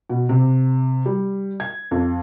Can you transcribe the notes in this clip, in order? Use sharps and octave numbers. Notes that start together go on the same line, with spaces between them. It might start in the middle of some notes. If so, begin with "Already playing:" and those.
B2
C3
G3
G#6
F2